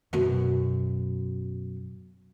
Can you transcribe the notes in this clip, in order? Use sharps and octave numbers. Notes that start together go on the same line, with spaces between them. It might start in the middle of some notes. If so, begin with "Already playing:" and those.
F#2 B2